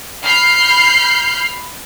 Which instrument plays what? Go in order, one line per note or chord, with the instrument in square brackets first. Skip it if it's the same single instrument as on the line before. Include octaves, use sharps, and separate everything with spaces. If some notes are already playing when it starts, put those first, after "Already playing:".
[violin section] B5 F6 G6 C7